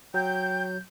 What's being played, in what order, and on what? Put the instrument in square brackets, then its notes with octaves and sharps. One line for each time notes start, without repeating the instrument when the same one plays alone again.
[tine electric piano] F#3 [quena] G5 [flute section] G6